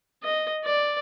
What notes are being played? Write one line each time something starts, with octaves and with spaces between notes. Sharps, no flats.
D#5
D5